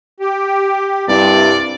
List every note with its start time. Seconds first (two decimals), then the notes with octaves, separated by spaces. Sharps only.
0.20 G4
1.08 C2 G2 C3 D5